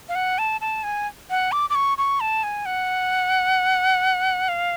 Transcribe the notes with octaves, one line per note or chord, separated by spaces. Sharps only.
F5
F#5
A5
A5
G#5
F#5
D6
D6
C#6
C#6
A5
G#5
F#5
F5